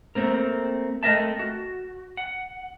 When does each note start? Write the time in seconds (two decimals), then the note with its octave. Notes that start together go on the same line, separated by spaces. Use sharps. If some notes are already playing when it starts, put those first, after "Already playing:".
0.15 A3 A#3 C4 A#4
1.03 A3 C4 A#4 D#5 E5 A5
1.39 F#4
2.17 F#5